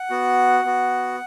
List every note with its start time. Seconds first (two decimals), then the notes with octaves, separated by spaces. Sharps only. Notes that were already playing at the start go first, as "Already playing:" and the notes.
Already playing: F#5
0.10 B3 F#4
0.64 B3 F#4